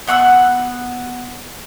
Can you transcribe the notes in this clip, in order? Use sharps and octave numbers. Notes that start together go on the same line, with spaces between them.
B3 F#5 C#6 E6